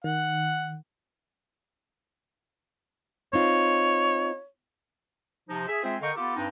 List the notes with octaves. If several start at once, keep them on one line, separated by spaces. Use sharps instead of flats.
D#3 F#5
C4 D#4 F4 C#5
C3 F3 D#4
G#4 E5
G#3 C4 F4 G#4 C5 E5
D3 A#4 D#5 F5 G5 C#6
B3 F4 G4 A4
G2 C4 D4 D#4